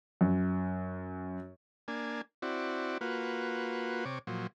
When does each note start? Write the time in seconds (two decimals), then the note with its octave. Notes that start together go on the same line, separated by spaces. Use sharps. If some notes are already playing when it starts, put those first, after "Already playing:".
0.21 F#2
1.88 A#3 D4 G#5
2.42 C4 E4 F#4 D5
3.01 A#3 F4 F#4 B4
4.05 C3 C#5 D6
4.27 A#2 F3 F#3